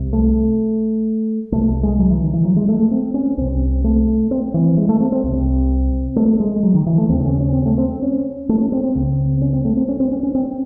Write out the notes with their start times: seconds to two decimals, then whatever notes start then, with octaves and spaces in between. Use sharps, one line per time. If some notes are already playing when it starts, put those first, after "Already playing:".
Already playing: C2 C3
0.13 A3
1.52 C2 C3 A3
1.83 G#3
1.98 F#3
2.10 E3
2.22 D#3
2.33 E3
2.45 F#3
2.56 G#3
2.68 A3
2.79 A3
2.91 C4
3.14 C#4
3.37 C2 C3 C4
3.84 A3
4.31 C4
4.54 E3
4.77 G#3
4.89 A3
5.00 C4
5.12 C4
5.24 C2 C3
6.16 A3
6.40 G#3
6.63 F#3
6.74 D#3
6.86 E3
6.98 A3
7.09 D#2 C4
7.14 C#3
7.21 C4
7.25 C#4
7.41 C#4
7.53 C4
7.66 A3
7.78 C4
8.02 C#4
8.49 A3
8.61 C#4
8.72 C4
8.84 C4
8.95 C#2 C#3
9.42 C#4
9.53 C4
9.65 A3
9.77 C4
9.88 C#4
10.00 C4
10.12 C#4
10.23 C#4
10.35 C4